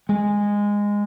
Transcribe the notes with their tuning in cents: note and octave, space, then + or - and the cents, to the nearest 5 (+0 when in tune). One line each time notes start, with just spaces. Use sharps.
G#3 -15